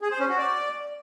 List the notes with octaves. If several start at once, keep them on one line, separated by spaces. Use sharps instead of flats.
G#4
C5
C#4
F#4
D5